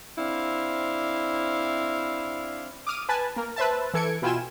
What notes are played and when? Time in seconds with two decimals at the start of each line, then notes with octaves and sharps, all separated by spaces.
0.18 C4 D4 E4 F5
2.87 D6 D#6 F6 D#7
3.09 B4 G#5 A5
3.36 A#3 A#4
3.56 B4 C5 E5 A5
3.94 E3 A4 G#6 C#7 D7
4.22 B2 E4 F4 G5 G#5 E7